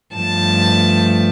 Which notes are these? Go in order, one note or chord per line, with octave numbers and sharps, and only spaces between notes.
G2 F3 A3 A5